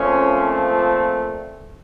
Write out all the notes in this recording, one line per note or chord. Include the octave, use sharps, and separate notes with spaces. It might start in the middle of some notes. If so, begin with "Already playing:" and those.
Already playing: A#2 F3 A3 C4 C#4